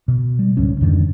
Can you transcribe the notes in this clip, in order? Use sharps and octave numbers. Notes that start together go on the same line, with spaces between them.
B2
G3
D1 C#2 G#2 C#4
F2 G#2 D3 D#3